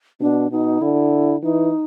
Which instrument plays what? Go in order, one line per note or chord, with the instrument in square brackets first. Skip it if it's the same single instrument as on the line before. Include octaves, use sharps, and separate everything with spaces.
[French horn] B2 [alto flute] D4
[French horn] B2 [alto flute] D#4
[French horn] D3 [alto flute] E4
[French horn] E3 [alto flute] D#4